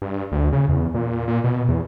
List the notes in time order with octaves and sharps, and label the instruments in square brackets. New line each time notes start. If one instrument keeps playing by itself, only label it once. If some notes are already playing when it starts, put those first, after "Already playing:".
[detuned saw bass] G2
D2
C#3
E2
A#2
A#2
B2
E2